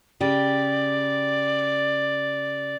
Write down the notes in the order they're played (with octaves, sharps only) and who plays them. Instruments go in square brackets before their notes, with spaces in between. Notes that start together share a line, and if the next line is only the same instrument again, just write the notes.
[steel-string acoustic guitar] C#3 G4 [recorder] D5